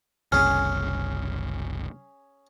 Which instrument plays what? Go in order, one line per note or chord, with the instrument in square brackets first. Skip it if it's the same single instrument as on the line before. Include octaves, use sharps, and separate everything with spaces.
[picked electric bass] F#1 C2 [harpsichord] C#4 G#4 [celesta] F6